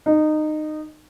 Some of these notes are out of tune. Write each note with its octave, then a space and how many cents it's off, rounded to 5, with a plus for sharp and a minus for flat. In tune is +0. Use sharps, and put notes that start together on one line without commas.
D#4 -20